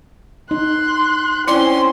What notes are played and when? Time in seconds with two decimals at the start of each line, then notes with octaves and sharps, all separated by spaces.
0.51 D#4 C6 F#6
1.47 C4 C#4 E4 D5 C6